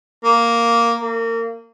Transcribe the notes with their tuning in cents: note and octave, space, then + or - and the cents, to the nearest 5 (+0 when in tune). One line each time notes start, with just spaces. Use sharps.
A#3 +0
A#3 -30